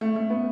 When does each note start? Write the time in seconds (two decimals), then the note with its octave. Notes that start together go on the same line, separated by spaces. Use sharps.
0.01 A3
0.16 A3
0.30 B3